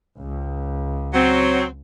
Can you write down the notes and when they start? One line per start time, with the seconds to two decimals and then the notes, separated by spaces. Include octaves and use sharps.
0.19 C#2
1.14 F#3 C4